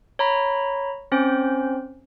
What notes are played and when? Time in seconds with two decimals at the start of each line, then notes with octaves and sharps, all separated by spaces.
0.19 C#5 A#5 B5
1.12 C4 C#4 C5